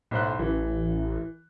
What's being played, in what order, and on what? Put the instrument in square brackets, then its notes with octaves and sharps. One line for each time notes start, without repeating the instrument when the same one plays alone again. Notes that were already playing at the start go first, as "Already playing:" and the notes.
[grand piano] B1 C5 F#6 [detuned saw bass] A2
[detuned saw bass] A1 [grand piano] E3